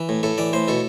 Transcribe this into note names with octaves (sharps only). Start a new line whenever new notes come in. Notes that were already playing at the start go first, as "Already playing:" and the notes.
Already playing: E3
A2
A2 A4
E3 D5
A2 C5
B2 A4